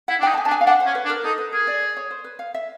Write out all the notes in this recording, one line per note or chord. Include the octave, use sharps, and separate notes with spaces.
E4 F#5
D4
D#4 G5
A5
G#5
D4 A5
G#5
F5
D4 F#5
C5
C#4
B4
D4
A#4
D#4 A4
B4
G#4 A#4
D5
D5
C#5
C5
B4
F5
E5